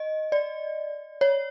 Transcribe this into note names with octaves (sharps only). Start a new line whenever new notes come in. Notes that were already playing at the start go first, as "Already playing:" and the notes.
Already playing: D#5
D5
C#5